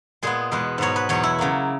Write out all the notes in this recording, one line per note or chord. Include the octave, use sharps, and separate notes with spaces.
A#2 G#3 B3 G#4
E2 B2 G#3 B4
G#2 F#3 B3 C#5
B4
E2 B2 F#3 C#5
E4
C#3 F#3 A#3